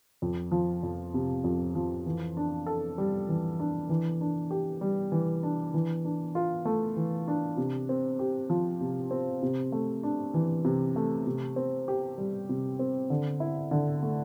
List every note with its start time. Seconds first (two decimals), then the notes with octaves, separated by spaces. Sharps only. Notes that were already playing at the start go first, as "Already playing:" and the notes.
0.22 F2
0.52 F3
0.83 F2
1.14 C3
1.44 F2
1.75 F3
2.06 E3
2.37 D4
2.66 A4
2.98 G3
3.29 E3
3.60 D4
3.89 E3
4.21 D4
4.51 G4
4.81 G3
5.12 E3
5.43 D4
5.74 E3
6.05 D4
6.35 F4
6.65 A3
6.97 E3
7.28 D4
7.57 C3
7.89 C4
8.19 G4
8.50 F3
8.81 C3
9.11 C4
9.43 C3
9.72 A3
10.03 D4
10.34 E3
10.65 C3
10.96 A3
11.27 C3
11.56 C4
11.88 G4
12.18 G3
12.49 C3
12.79 C4
13.10 D3
13.40 E4
13.71 D3
14.03 A3